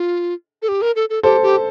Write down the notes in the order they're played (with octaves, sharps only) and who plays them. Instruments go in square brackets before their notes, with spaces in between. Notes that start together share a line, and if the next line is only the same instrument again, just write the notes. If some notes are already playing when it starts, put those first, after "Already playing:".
Already playing: [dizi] F4
A4
G4
A#4
A4
A4
[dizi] G4 [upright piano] A4 C5
[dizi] G4